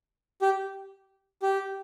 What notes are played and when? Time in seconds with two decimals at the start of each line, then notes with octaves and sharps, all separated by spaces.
0.42 G4
1.42 G4